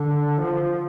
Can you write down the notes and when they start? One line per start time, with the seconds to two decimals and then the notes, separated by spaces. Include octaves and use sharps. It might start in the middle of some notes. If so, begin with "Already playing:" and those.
Already playing: D3
0.41 F3